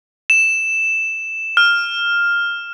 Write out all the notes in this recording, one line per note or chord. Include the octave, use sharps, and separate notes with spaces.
E7
F6